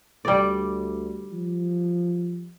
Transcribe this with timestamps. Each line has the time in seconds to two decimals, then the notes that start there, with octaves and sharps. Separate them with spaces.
0.25 D2 G3 D5
1.32 F3